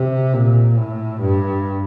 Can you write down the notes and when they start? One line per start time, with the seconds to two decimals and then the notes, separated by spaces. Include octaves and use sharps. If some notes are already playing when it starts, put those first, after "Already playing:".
Already playing: C3
0.34 A#2
0.78 A2
1.21 G2